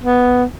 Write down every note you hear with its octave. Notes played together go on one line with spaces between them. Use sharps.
B3